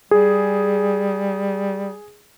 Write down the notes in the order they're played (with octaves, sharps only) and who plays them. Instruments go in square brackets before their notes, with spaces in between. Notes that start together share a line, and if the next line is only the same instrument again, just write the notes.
[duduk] G3 [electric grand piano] G#4